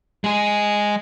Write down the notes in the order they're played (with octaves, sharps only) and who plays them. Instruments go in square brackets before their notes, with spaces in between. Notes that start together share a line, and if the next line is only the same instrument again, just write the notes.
[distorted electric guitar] G#3 G#4